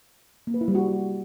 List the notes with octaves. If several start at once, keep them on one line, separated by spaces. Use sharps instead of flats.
A#3
B4
E4
G3
F#4